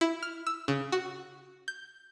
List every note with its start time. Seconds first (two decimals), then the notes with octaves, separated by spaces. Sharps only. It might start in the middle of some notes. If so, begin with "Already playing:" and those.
0.01 E4
0.23 F6
0.47 E6
0.68 C#3
0.92 F#4
1.68 G6